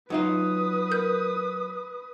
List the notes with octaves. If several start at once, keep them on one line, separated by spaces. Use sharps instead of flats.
F#3 D#4 F4 B4 D#6
A#4 G6